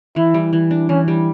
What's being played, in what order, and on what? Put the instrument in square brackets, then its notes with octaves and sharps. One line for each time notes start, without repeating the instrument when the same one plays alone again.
[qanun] E3 [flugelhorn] E4
[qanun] G3
E3
D4
[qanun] E3 [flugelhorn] C#4
[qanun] G3